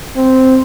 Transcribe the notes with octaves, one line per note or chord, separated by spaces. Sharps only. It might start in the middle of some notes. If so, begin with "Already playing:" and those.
C4